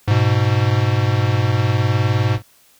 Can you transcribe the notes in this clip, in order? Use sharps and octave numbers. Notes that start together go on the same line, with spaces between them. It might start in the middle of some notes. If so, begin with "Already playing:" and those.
G#2 B2